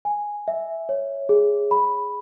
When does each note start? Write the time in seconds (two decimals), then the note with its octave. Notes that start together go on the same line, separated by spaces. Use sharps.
0.05 G#5
0.48 E5
0.89 C#5
1.29 G#4
1.71 B5